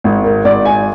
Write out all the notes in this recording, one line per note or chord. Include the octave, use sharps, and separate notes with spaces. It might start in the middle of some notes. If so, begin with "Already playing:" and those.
G#1
A#4
G#1 D5
G#5